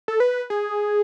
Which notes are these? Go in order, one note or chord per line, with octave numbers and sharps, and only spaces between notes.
A4
B4
G#4